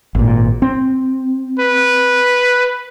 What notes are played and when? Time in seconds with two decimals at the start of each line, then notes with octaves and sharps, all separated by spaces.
0.15 G#1 A#2
0.62 C4
1.59 B4